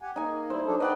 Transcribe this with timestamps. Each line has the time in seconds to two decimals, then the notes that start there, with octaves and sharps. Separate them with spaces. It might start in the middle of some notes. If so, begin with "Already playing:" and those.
0.02 G4 F#5 G#5
0.16 A#3 D#4 G#5
0.50 G3 E4 C5
0.67 F#3 D4 A4
0.80 D4 B4 D5 D#5 F#5 G5